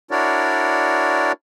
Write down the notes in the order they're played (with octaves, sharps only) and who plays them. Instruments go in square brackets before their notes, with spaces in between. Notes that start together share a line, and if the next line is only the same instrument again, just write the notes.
[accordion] D4 E4 F#4 A#4 C#5 D5